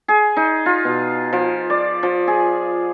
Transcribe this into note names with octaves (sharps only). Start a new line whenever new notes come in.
G#4
D#4
F4
B2
F3
D5
F3
G#4